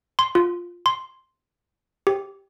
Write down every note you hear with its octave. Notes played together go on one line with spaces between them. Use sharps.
C6
F4
C6
G4